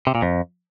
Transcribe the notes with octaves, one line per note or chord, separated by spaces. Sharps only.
C3
A#2
F2